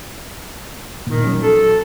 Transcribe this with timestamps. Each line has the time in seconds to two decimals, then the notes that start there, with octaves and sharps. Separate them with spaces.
1.07 A#2 D#3
1.24 F#3 C#4
1.42 A4